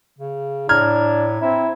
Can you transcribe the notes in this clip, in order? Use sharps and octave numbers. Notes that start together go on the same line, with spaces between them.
C#3
A2 D4 A#5 F6 G#6
C4 E4